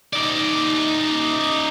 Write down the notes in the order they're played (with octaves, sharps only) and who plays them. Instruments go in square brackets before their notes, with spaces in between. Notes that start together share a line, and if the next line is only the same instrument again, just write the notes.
[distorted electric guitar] D#4 D5